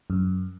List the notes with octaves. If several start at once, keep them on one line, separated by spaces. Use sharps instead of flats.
F#2